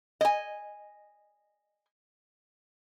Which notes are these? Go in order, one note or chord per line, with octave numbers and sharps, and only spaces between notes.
D#5 G#5